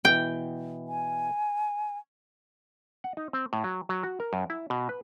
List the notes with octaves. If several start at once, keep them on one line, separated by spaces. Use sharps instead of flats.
B2 E3 G5
G#5
F#5
D#4
C4
A2
F#3
F#3
F#4
A#4
F#2
E4
B2
B4